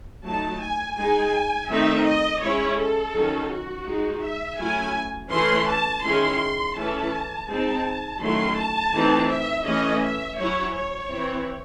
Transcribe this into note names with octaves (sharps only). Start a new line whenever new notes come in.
F#3 A3 D#4 A5
G#5
G#3 D#4 G#5
D#3 A3 C4 D#4 E5
D#5
G#3 C#4 E4 C#5
A4
D#3 F#3 C#4
F#4
G#3 D#4
E5
F#3 A3 C#4 E4 G#5
E3 A3 C#4 E4 C6
A5
D#3 G#3 C#4 E4 C6
E3 A3 C#4 E4 A5
G#3 C4 D#4 A5
D#3 F#3 A3 C#4 E4 C6
A5
E3 A3 C4 D#4
E5
E3 A3 C#4 D#5
E5
F#3 C#4 E4 C#5
C#5
E3 C4 E4